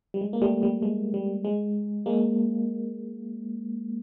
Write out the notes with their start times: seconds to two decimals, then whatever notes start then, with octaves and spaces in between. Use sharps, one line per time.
0.14 G3
0.21 G#3
0.33 A#3
0.42 G3 A3
0.63 G3
0.82 G#3
1.14 G3
1.45 G#3
2.06 G#3 A#3